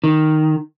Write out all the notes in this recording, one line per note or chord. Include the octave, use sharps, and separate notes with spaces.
D#3